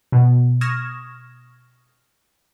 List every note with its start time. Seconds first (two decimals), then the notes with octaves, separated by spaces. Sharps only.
0.12 B2
0.61 C#6 D#6 F6 G#6 A#6 E7